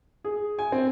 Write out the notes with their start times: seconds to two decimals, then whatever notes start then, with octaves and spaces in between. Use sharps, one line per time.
0.24 G#4
0.59 G#5
0.72 C4